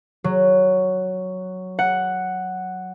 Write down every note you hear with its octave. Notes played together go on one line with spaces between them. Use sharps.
F#3
F#5